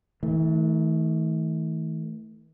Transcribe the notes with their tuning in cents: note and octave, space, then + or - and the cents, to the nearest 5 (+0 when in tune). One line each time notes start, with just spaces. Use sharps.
E3 -45 A3 +0